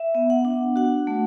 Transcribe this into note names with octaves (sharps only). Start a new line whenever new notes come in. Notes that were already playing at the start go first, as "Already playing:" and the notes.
Already playing: E5
B3
F#5
D4
F#4 F#5
A3